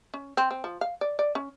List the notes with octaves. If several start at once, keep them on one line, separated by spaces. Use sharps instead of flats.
C#4
C4
C4
F3
F5
D5
D5
C#4